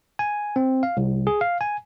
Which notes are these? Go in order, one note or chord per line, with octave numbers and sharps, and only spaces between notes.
G#5
C4
F5
C2
G#4
F5
G#5